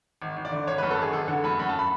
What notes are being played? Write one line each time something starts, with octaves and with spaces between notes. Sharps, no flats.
G#1
G#1
D5
D3
G#1 C#5
F#2 B4
A4
G#1 G#4
G#1 A4
D3 F#5
F#2 B5
F#2 B5
A5
B5